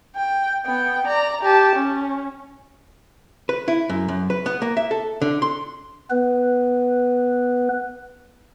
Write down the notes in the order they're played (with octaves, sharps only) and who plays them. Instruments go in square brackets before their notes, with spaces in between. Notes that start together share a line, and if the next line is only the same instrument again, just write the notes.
[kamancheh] G5
B3 G5
D5 A#5
G4 A5
C#4
[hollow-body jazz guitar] B4
E4
F#2
F#2
B4
B3
A#3
E5
A4
D3
C6
[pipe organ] B3 B4